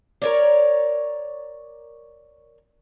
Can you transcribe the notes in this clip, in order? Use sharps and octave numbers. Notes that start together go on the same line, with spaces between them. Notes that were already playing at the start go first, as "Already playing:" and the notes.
A#4 C#5 D5